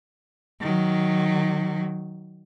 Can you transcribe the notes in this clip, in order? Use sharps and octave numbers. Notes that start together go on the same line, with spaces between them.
D#3 F#3